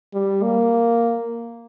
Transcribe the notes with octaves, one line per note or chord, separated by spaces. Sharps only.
G3
A#3